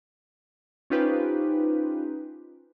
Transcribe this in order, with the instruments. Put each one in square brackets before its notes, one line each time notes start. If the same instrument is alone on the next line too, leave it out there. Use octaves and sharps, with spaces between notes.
[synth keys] C#4 D#4 F4 G4 B4 C5